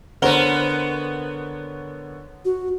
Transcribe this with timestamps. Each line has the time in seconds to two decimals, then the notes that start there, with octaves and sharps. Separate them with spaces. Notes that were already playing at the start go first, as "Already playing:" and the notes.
0.22 D3 B3 A#4 C5 C#5 F#5 G7
2.45 F#4